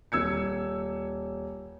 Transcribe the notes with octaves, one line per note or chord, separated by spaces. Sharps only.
D#1 E6 G#6 C#7